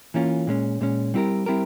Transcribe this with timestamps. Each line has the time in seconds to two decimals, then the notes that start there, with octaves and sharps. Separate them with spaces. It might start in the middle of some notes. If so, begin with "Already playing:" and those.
0.14 E3 A#3 C#4 F4
0.47 A#2 G#3 C#4
0.81 A#2 G#3 C#4
1.14 G3 C4 E4 G4 A#4
1.46 G3 C4 E4 G4 A#4